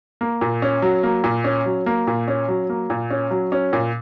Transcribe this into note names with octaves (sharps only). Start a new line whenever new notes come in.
A#3
A#2
C#4
F#3
A#3
A#2
C#4
F#3
A#3
A#2
C#4
F#3
A#3
A#2
C#4
F#3
C#4
A#2